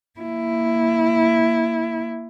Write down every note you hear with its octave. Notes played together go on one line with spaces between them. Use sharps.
A#3 E4